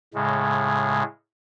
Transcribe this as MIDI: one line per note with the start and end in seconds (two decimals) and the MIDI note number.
0.14 1.03 45
0.14 1.03 49
0.14 1.03 56